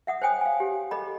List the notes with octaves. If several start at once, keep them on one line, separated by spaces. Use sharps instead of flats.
E5 F#5 D#6
C5 C#5 G5 G#5 D#6
F5 G#5
G4
A4 D#5 B5